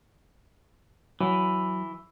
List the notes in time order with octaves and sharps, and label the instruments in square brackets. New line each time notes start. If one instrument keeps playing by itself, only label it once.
[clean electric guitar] E3 [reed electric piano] F#3